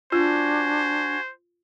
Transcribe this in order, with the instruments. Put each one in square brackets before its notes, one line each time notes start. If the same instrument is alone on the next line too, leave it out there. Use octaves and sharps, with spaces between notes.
[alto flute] D4 [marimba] F4 [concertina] F#4 G#5 [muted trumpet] C5